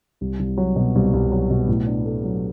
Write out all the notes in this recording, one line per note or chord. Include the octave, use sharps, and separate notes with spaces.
C2
C2
F#3
B2
C2
C2
F#3
B2
A2
D4
A3
F#3